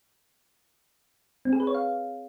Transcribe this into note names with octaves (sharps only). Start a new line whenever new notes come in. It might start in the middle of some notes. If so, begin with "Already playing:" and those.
C4
G#4
B4
C#5
F5